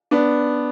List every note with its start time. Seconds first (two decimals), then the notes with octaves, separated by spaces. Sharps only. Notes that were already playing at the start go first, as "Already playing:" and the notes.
0.11 B3 D4